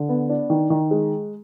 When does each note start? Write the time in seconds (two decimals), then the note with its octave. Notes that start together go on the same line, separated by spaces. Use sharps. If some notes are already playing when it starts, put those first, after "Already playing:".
Already playing: D3
0.09 B3
0.29 D4
0.50 D#3
0.70 D#3
0.91 G#3